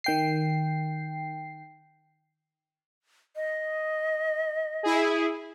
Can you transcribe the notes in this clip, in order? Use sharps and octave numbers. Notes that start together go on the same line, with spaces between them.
D#3 G5 C7
D#5
E4 G#4